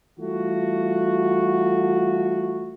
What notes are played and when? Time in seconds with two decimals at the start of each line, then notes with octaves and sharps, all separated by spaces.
0.19 E3 G3 A3 F4 F#4